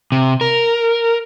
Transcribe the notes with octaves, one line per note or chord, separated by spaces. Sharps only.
C3
A#4